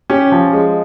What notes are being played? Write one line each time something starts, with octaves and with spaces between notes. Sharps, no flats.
C#4 G4
F3
G#3